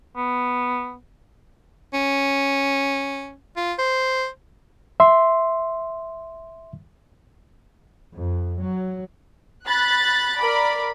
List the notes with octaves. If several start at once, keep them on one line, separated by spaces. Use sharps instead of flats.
B3
C#4
F4
C5
E5 C6
F2
F#3
B5 F#6 A6
A#4 D5 B5